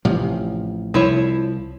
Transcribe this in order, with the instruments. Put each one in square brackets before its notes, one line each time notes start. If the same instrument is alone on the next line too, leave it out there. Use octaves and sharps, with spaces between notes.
[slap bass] A1 C3 F3
[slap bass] C2 [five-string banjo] F3 E4 C#5